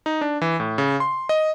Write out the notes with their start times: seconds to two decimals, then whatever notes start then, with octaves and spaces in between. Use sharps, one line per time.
0.06 D#4
0.21 D4
0.42 E3
0.60 A2
0.78 C#3
1.00 C6
1.29 D#5